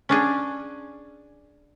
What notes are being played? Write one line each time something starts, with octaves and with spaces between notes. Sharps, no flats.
C#4 D4 G#4